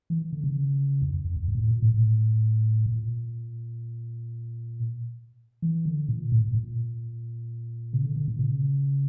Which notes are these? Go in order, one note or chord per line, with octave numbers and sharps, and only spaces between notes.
E3
D3
C#3
F2
F2
F2
E2
G2
A#2
A2
A#2
A2
A2
A#2
E3
D3
A#2
A2
A2
A#2
C#3
D3
D3
A#2
C#3